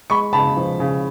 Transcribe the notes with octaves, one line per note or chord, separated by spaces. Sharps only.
G#3 B5 C#6
C#3 A5 B5
F3
C#3